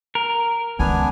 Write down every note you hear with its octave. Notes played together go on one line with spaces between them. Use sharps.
A#4
C#2 D#3 B3 D4 G#5